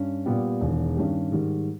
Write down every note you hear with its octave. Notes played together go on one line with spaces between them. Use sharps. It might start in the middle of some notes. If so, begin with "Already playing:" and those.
Already playing: G2 C#4
A#2 G3 B3 G4
E1 E2 D#3
G2 D#3 G3 C#4 G4
G#2 D#3 G3